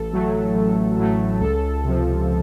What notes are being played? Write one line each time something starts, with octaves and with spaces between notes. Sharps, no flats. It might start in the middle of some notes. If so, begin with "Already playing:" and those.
Already playing: A1 A4
A2 F#3 A3
A1
A2 F#3 A3
C#2 A4
C3 F3